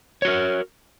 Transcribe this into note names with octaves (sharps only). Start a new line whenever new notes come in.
F#4 A#4 C#5